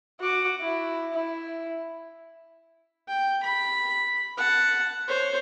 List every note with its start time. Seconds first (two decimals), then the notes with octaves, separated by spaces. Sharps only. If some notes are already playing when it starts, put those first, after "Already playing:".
0.20 F#4 D6
0.61 E4
1.13 E4
3.08 G5
3.43 B5
4.37 F#5 A5
5.08 C5 C#5